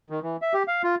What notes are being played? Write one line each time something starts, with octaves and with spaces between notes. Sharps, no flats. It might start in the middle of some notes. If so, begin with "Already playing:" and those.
D#3
E3
E5
G4
F5
F4